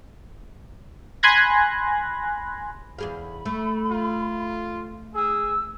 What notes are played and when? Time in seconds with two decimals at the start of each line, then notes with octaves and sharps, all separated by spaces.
1.23 G#5 B5 C6 F#6 G#6 A#6
2.99 E2 G#4 F5 B5
3.45 A3
3.90 F4
5.14 G#4 E6